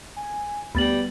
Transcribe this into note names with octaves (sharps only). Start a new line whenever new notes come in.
G#5
D2 G3 B3 B5 A6 F#7